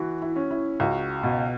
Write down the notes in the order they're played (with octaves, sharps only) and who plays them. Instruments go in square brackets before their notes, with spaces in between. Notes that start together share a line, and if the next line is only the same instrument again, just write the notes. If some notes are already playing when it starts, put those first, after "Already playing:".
Already playing: [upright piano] E3 [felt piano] F#4
[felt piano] E4
[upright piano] C#4
[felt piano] E4
[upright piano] C#2 [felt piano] F#4
[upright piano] B2